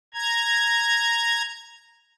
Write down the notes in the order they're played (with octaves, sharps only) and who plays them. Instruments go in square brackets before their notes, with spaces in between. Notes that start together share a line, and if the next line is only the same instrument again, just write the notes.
[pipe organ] A#5 G#6